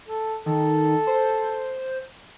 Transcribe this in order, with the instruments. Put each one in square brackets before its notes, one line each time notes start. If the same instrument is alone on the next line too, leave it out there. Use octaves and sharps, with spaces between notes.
[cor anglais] A4
[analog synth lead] D#3 [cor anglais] A4
[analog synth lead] C5